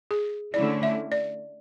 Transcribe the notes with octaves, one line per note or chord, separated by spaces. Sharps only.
G#4
D3 A3 C#4 E4 D5
E5
D5